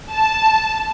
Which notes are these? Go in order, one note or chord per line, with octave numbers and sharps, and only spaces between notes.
A5